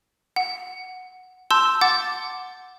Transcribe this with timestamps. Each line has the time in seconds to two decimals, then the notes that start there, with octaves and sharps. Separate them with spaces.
0.36 F#5
1.51 A5 C6 E6 G6
1.81 F#5 D6 A6